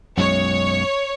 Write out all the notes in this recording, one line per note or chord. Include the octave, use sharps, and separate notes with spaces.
B1 F#2 G#3 C#5